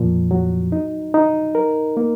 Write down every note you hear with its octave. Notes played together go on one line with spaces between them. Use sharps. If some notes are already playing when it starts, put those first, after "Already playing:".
Already playing: F2 A#2 F3
F#3
D#4
D#4
A#4
A#3